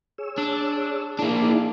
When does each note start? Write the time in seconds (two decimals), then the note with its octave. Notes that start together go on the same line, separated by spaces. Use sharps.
0.18 G#4 C#5 E6
0.38 D4
1.19 A#3 D4 E4 G#4
1.42 D#4 E4 G#4